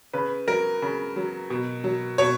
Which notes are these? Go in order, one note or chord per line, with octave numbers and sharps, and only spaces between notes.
C#3 B4
F#3 A#4
C#3
F#3
B2
F#3
B2 C#5